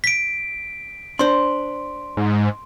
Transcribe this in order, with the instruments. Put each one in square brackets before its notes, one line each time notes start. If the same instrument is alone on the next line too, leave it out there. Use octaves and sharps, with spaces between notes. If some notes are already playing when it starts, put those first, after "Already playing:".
[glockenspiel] B6 D7
[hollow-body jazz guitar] D4 C5 [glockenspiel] C6
[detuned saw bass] G#2